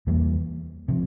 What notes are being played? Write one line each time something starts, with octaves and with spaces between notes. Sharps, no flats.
E2 E3 G3 A#3
C3 F3